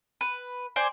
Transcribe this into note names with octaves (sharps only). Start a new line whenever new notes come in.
B4
C5 D5 G#5